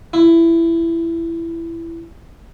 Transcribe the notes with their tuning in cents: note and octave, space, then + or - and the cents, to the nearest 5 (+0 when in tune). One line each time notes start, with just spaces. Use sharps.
E4 +15